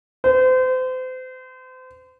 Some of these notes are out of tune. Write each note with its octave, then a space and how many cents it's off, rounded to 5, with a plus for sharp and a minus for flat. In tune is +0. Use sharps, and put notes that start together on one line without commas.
C5 -35